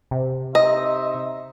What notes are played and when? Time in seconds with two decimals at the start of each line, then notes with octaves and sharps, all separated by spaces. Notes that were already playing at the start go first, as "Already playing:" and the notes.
0.11 C3
0.55 D#4 C5 D#5 E5